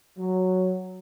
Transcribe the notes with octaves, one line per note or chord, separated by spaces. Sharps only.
F#3